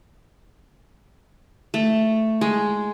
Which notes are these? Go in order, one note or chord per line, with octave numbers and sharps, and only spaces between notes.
A3
G#3